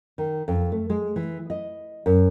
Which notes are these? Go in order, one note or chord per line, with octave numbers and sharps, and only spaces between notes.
D#3
F2
A3
G#3
E3
D#5
F#2